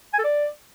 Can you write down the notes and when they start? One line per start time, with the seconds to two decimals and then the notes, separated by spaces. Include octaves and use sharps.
0.13 G#5
0.19 A4
0.24 D5